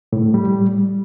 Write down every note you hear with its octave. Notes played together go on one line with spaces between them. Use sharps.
A2
G3